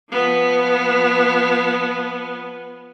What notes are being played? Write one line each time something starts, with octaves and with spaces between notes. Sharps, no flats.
F3 B3